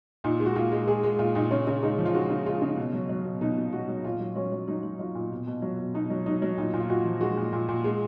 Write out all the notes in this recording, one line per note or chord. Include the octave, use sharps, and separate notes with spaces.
A#2 D#4
G#3
F#4
A#2 F4
G#3
G#3 G#4
G#3
A#2 F4
A#2 D#4
C#3 C#4
C#3
G#3 D#4
F3
F4
G#3 F#4
C#3
G#3 F4
C#3
B2
F#3
F#3
B2
B2 D#4
B2
F#3 F#4
F#3
A#2 F4
F#3
F#3 C#4
F#3
F#3 D#4
F#3
F#3 F4
A#2
B2
B2
F#3
B2
B2 D#4
F#3
F#3 D#4
F#3
A#2 D#4
A#2
F4
A#2 F#4
F3
G#3 F#4
A#2
A#2
A#2
G#3